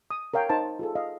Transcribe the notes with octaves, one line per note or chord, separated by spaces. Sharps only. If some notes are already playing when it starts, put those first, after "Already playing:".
D#6
A#4 C#5 F5 G5
D#4 C5 A5
F4 G#4 A4
D#5 F5